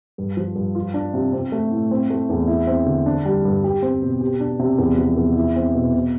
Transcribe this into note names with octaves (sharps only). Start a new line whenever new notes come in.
G2
F3
G2
F4
D4
C3
C4
A3
A2
C4
A3
E2
E4
C4
D3
D4
G3
G2
G4
C4
B2
G4
D4
C3
E2
F3
E2
E4
C4
B2
B2